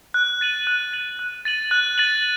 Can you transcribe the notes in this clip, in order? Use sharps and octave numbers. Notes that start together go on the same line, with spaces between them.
F#6
A6 D#7 F#7
F#6
A6 D#7 F#7
F#6
A6 D#7 F#7
F#6
A6 D#7 F#7